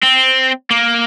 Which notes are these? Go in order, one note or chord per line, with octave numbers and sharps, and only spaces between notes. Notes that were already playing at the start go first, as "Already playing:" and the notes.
C4
A#3